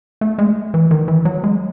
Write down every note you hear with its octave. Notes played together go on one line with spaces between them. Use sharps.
A3
G#3
E3
D#3
E3
F#3
G#3